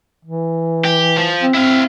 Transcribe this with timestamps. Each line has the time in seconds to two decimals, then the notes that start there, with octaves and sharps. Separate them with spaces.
0.25 E3
0.85 G4
1.17 F3
1.42 C4
1.55 C4 E4 F5